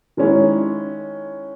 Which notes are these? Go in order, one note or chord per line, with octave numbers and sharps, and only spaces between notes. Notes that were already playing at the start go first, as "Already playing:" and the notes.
D#3 G#3 C#4 E4